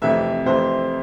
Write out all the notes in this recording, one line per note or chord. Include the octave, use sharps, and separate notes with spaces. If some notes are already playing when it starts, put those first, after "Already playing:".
F2 C3 E3 A3 E5
F2 C3 E3 A3 C5